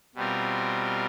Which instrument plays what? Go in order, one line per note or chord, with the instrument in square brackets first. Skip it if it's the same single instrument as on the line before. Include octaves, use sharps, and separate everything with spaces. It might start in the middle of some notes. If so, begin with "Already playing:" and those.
[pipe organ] B2 G3 C4 F4 A#4